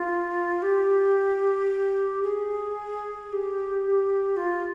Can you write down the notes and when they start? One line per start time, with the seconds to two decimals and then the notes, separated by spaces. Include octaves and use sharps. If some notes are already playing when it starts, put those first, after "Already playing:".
Already playing: F4
0.62 G4
2.23 G#4
3.29 G#4
3.32 G4
4.37 F4